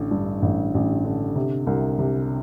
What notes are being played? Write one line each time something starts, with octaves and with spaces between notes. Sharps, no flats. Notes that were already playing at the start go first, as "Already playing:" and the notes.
Already playing: A1 D3
G2
A1
A1
D3
C3
C2
C3